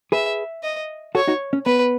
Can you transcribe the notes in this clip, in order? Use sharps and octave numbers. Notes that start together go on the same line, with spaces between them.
G#4 B4 E5
D#5
F#4 A4 C#5
D#4 F#4
C#4
B3 B4